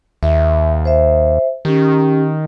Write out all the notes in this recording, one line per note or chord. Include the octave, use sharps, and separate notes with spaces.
D#2 E5
C5 E5
D#3 C#4 G4